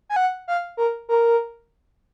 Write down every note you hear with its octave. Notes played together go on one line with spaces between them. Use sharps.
G#5
F#5
F5
A#4
A#4